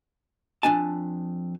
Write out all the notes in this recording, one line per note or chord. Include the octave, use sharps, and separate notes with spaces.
F2 A#3 D4 G#5 A5